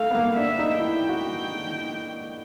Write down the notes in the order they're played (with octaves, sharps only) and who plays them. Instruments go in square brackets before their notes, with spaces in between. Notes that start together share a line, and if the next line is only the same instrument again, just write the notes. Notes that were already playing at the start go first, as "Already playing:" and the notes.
Already playing: [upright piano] A3 [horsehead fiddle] F5
[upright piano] B3
A#3
[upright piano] D4 [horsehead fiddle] E5
[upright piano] D#4
[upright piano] E4 [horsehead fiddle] G5
[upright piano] F#4